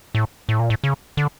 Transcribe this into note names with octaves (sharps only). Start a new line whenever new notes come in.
A2
A2
A#2
A2
C#3
D3